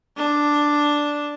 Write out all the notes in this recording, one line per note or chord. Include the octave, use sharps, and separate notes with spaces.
D4